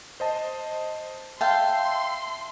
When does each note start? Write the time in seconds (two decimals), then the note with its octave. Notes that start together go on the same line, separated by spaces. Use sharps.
0.20 C5 D#5 A5
1.41 E5 F5 G5 A5 C6